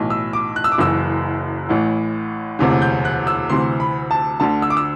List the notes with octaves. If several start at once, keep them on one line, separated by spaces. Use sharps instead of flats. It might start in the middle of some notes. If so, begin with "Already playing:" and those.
Already playing: B1 A2 E3
E6
D6
F#6
E6
D6
F#1 F#2 E3 E6
A1 A2 E3
E1 D2 C3 E3
G6
F#6
E6
D2 C3 E3 C6
B5
A5
D2 D3 A5
E6
D6
E6